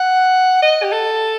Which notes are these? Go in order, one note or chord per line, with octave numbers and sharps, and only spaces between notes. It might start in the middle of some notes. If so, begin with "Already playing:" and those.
Already playing: F#5
D#5
G4
A4